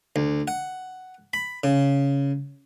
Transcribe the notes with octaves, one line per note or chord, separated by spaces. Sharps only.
D2
F#5
B5
C#3